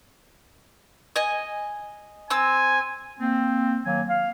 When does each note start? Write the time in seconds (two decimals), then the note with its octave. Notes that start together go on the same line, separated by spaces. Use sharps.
1.16 D#5 G#5
2.30 C4 G#5 E6
3.20 A#3 C4
3.84 D#3 F#3 A#3 G#5
4.09 F5